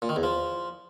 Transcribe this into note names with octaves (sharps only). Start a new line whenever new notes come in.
A#2
D#3
E2
F3